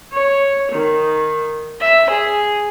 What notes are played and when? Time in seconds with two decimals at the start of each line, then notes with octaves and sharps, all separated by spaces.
0.14 C#5
0.72 D#3
1.80 E5
2.11 G#4